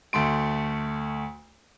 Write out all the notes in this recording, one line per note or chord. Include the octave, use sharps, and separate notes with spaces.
D2 A3 C6 D7